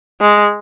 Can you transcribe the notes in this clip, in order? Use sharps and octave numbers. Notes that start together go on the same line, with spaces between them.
G#3